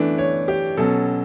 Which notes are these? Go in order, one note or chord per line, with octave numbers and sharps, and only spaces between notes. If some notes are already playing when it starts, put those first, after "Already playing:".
Already playing: E3 A3 D4
C#5
G4
B2 F#3 C#4 A4